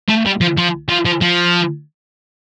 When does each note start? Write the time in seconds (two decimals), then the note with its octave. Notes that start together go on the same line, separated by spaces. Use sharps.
0.09 A3
0.26 G3
0.41 F3
0.58 F3
0.89 F3
1.05 F3
1.21 F3